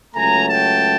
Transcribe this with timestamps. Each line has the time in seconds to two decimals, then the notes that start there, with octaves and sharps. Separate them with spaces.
0.15 C#2 C#3 F#3 A3 G#5 A#5
0.49 G5 A5